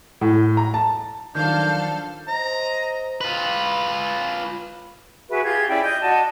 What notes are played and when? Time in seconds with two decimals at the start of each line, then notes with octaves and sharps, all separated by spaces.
0.21 A2
0.57 A#5
0.74 A5
1.35 D#3 F3 F#3 D4 A4 F5 G6
2.28 C5 D#5 A#5
3.21 F4 B4
5.29 F#4 G#4 B4 E5
5.44 F4 G4 G#4 G#6
5.68 C#4 E4 D5 G5
5.83 D#5 G6
6.01 F#4 D5 D#5 A5